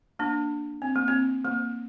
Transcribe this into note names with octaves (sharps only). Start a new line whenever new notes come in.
A#3 D4
C4
A#3
C4
A#3